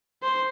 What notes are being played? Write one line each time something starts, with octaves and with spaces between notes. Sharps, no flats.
C5